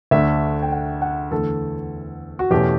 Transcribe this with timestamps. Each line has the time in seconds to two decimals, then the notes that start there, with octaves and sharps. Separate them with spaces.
0.11 D2 D3 A3 D4 E5
0.62 G5
0.72 F#5
1.02 F#5
1.31 E2 D3 A3 A4
2.39 F#4
2.51 E2 B2 A3 C#4 G4